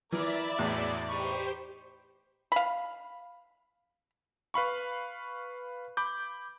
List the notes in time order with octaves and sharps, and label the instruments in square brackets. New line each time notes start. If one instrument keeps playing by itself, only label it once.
[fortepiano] E3 [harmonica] A#4 [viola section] D5 [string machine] E5 B5 A6
[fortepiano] E2 A2 [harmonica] F#3 G#3
[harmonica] D#4 B5 C#6 [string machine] G4 C5
[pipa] F5 B5
[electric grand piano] B4 F5 B5 C#6
B5 D6 G6